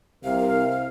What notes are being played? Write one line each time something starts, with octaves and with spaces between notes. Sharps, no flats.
C2 C3 A#4 F5